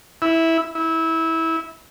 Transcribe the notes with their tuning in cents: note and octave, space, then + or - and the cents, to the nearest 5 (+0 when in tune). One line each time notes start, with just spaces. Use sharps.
E4 -10
E4 -20